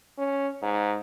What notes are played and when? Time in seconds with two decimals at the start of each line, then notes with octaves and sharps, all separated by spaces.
0.18 C#4
0.62 G#2